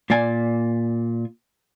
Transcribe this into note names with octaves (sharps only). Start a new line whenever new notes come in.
A#2 A#3 D5 G#5